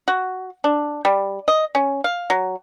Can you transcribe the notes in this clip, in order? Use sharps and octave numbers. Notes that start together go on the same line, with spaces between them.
F#4
D4
G3
D#5
C#4
F5
F#3